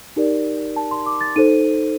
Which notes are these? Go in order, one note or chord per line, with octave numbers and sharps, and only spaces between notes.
D#4 G4 A#4 D5
A5
C6
D6
A6
D#4 A4 C5 D#7